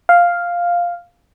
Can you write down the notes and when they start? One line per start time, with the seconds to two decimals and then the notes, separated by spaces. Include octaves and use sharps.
0.09 F5